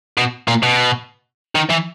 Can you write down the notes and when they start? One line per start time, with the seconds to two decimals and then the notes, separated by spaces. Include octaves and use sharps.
0.18 B2
0.48 A#2
0.63 B2
1.55 D#3
1.70 E3